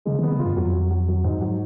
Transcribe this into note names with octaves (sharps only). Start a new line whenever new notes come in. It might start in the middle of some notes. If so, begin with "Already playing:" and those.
C#3 G#3
D#3
B3
C#3
F4
F#2
F2 F#3
F#3
F#3
F#3
G#2
F#3